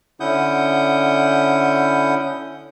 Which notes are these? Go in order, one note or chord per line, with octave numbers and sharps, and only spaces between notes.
D3 C#4 E4 F#5 D#6 G6